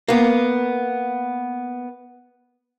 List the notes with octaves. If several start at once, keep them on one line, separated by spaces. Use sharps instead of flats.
A#3 B3